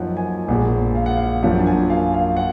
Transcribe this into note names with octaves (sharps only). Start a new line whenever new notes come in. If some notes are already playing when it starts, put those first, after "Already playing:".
Already playing: F#2 F3 A#3 D#4 F#5
G#5
A#1 A#2 G#3 F#5
F5
F#5
F5
F#2 F3 A#3 D4 F#5
G#5
F5
F5
F#5